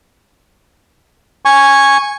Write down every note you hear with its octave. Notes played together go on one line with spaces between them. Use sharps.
G#5 C#6